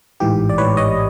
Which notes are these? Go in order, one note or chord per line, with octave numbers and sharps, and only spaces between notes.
A1 G#2 E3 G4
D5
A1 G#2 E3 B4 C#5
C#5 D#5